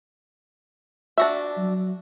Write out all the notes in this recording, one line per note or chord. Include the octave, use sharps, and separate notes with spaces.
D4 F#4 E5
F#3